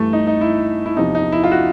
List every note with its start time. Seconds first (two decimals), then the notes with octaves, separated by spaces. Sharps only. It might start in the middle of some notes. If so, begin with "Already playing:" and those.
Already playing: G2 E3 A3
0.13 D#4
0.27 D#4
0.41 E4
0.86 E4
0.96 E2 C3 F3 D#4
1.15 D#4
1.32 E4
1.44 F4
1.51 F#4